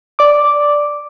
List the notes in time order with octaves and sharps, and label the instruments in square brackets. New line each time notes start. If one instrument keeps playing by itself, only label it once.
[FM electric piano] D5 D6